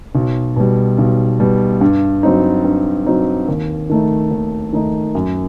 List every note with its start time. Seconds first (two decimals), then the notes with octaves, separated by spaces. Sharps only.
0.15 B1
0.56 B2 G3
0.98 B1
1.40 B2 G3
1.81 G2
2.23 F#3 C4 D#4
2.65 G2
3.06 F#3 C4 D#4
3.48 D#2
3.89 D#3 A3 D#4
4.31 D#2
4.73 D#3 A3 D#4
5.15 F#2